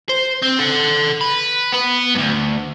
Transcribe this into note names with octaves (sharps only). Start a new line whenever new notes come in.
C5
C4
A4 F#5
B4
B3 B4
D2 G2